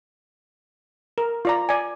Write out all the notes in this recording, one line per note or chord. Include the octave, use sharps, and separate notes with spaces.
A#4
F4 D5 A#5
D5 G#5